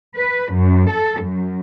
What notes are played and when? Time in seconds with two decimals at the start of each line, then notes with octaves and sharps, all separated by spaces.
0.15 B4
0.53 F#2
0.91 A4
1.22 F#2